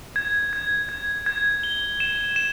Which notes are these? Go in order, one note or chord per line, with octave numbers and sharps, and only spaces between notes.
G#6
G#6
G#6
G#6
G7
E7
E7